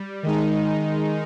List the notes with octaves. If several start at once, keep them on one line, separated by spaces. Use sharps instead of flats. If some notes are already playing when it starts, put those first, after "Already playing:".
Already playing: G3
D#3 G#3 D#4